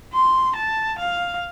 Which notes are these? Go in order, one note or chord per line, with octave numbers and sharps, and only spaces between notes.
C6
A5
F5